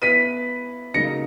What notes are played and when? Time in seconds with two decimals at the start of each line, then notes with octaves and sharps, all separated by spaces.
0.02 B3 E4 B4 B6 D#7
0.94 C#3 F#3 A#3 D#4 A#6 C#7